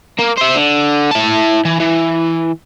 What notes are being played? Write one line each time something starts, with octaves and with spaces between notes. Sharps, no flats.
A#3
C5 E5
D3
E4 A5
E3
E3